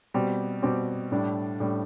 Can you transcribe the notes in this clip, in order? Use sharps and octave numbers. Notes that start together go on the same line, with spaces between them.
B2 G3 C4 G4
B2 G3 C4 G4
A2 G3 D4
A2 G3 D4